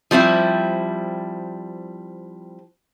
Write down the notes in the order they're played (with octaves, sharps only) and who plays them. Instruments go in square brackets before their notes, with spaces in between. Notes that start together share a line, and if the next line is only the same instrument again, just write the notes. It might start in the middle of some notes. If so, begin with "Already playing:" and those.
[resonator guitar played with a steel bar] F3 G3 C4 E4